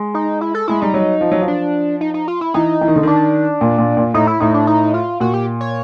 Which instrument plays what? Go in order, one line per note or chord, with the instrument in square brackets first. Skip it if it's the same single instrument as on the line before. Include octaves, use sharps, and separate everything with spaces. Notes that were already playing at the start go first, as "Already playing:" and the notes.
Already playing: [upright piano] G#3
[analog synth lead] D#4
E4
A4
[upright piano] G#3 [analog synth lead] E4
[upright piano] G3 [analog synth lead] D#4
[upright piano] F#3
F3
F#3
F3
[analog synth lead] D4
D#4
D#4
F4
E4
[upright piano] E3 [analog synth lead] D#4
[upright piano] E3
D#3
D3
[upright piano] D#3 [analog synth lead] D4
[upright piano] A#2
A#2
A#2
[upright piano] A2 [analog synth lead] D#4
[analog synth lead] E4
[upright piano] A2 [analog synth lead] D#4
[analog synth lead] D4
D#4
F4
[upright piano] A#2 [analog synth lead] F#4
[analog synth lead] G4
C#5